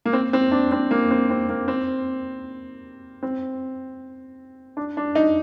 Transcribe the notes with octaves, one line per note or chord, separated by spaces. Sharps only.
A#3
C4
C4
D4
C4
A#3
C4
C4
A#3
C4
C4
D4
D4
D#4